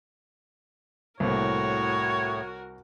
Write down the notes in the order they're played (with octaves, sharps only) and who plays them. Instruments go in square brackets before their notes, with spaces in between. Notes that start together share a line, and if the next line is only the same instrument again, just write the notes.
[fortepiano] C2 A#3 [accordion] A2 [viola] F#4 A#4 [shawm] C#5